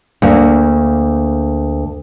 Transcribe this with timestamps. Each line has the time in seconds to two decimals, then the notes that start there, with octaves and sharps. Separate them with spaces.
0.22 D2 A#3